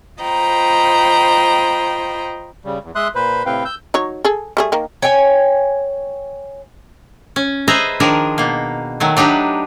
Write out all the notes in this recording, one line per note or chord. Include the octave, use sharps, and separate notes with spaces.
F4 C5 D#5 G5 A#5 B5
C#3 G3
E2
G#3 E5 C6 D#6 F#6
A#2 B4 C5 B5
A2 C3 C4 B4 F5 G5
E6 G6
F#3 D#4 C#5
G#4 A4
G3 A3 G#4
D#3 A#3
C#5 G5 G#5
C#4
G#4 B4 C5 D#5 E5 A#5
D#3 F3 D4 G#4 A#4
B2 A#3
D#3 F#3 A3
F#3 D4 D#4 G4 B4